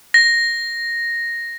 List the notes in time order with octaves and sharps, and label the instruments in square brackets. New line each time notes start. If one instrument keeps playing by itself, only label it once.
[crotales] A#6